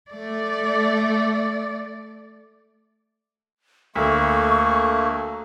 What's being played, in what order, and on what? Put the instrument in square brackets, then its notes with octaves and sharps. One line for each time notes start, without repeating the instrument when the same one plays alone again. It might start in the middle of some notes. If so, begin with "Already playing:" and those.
[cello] A3 D5
[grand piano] D2 [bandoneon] A3 A#3 [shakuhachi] C#6